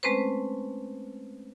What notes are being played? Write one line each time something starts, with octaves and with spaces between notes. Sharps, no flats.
G#3 A3 C4 C#4 B4 C5